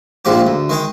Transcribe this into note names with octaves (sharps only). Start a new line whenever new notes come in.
A#1 G#2 F3 G4
D2
D#3 G#3 G5